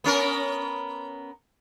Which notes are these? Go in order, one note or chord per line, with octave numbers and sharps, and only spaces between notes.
B3 C#4 A#4